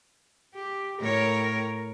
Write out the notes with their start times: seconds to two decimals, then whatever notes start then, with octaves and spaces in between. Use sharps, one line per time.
0.55 G4
0.99 A2 A#4 C#5